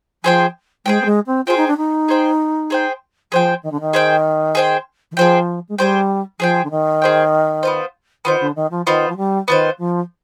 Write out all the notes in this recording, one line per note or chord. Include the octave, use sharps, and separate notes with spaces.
F3 G#4 C5 G5
G#3 G#4 C5 G5
B3
G#3
C4
F4 G#4 C5 G5
D#4
D4
D#4
G#4 C5 G5
G#4 C5 G5
F3 G#4 C5 G5
D#3
D3
D#3
G#4 C5 G5
G#4 C5 G5
D#3
F3 G#4 C5 G5
G#3
G3 G#4 C5 G5
F3 G#4 C5 G5
D3
D#3
G#4 C5 G5
B3 F4 C5
D#3 B3 F4 C5
D3
D#3
F3
D#3 B3 F4 C5
F3
G3
D#3 B3 F4 C5
F3